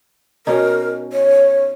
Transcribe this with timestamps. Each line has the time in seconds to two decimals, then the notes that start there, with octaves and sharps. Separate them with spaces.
0.47 B2 C#4 D#4 A#4
1.12 C#5